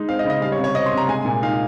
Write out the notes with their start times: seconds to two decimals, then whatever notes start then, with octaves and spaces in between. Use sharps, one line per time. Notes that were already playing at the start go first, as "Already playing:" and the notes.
Already playing: G#3 D#4
0.08 C4 F5
0.19 D#5
0.25 C#3
0.30 D#5
0.41 G3 F5
0.52 C#5
0.58 C3
0.64 C#5
0.75 C4 D#5
0.86 C6
0.92 C3
0.97 A#5
1.09 G#3 G#5
1.25 A#2
1.42 D#4 F5